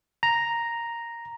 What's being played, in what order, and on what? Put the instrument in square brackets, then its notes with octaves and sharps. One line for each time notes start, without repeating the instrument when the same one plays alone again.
[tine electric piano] A#5